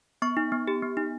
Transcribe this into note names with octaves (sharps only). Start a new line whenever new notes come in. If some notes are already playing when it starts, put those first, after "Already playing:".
B3 C#6
D#4
B3
G4
B3
D#4